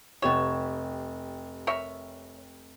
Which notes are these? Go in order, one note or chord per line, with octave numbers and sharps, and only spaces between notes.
F1 B3 G4 C#5 E7
A#4 C#5 E5